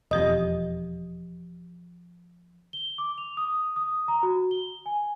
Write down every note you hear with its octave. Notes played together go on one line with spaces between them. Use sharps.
E1 F2 F3 G4 D#5 D#6
G7
D6
F7
D#6
D#6
A#5
F#4
G7
G#5